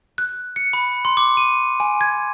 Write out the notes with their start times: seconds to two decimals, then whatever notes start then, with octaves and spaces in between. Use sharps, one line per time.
0.18 F#6
0.56 C#7
0.73 B5
1.05 C6
1.17 D6
1.37 D#7
1.80 G#5
2.01 G#6